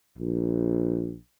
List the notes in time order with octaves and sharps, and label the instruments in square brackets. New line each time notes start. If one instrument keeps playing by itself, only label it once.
[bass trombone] A#1